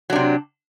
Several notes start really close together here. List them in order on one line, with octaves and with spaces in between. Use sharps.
F#3 D4 C3